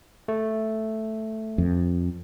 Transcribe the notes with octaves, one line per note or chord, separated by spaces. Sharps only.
A3
F2